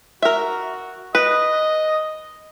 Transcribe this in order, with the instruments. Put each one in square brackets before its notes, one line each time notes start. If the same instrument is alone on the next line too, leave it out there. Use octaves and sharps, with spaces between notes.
[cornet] F#4 [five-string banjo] A#4 E5
[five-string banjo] B4 [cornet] D#5